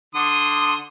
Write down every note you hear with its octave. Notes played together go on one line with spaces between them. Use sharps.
D3 C6 D#6